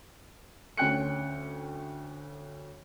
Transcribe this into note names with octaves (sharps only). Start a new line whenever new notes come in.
D2 C#4 G5 F#6 C#7